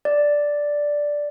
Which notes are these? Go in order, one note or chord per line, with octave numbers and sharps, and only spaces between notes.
D5